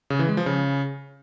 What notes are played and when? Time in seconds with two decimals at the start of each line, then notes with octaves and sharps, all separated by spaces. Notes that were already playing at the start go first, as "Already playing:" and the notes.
0.10 C#3
0.19 E3
0.28 G#3
0.37 F3
0.46 C#3